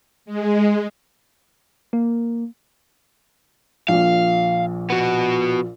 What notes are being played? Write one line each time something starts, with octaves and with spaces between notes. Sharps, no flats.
G#3
A#3
A#1 A#2 F5
B3 F#4